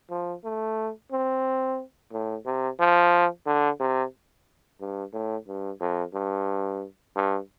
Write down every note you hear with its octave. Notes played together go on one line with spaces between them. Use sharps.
F3
A3
C4
A2
C3
F3
D3
C3
G2
A2
G2
F2
G2
G2